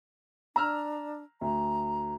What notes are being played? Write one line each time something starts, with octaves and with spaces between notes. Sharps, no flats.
D4 A#5 E6 F6
D2 A#5